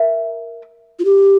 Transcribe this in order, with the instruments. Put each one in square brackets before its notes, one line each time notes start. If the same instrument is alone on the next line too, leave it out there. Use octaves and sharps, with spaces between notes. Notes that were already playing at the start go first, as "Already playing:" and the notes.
Already playing: [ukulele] A#4 E5
[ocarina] F4
G4